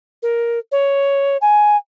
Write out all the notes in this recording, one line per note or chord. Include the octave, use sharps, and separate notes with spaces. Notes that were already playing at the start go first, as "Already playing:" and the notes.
A#4
C#5
G#5